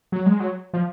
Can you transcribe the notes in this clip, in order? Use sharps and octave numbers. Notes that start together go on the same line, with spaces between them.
F#3
G#3
F#3
F3